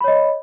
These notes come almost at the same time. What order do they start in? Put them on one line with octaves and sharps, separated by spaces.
B5 C#5 D#5